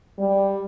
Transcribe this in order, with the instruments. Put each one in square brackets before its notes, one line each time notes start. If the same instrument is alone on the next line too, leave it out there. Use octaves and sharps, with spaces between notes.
[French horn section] G3